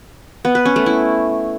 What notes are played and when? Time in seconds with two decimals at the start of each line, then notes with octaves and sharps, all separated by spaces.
0.45 B3
0.55 B4
0.65 C#4
0.76 A3
0.86 E4